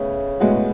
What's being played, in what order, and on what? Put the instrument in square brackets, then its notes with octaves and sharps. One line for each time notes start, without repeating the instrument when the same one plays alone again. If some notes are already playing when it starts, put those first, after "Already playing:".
Already playing: [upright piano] A2 B3 [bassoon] C#3
[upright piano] A2 G#3 B3 F#4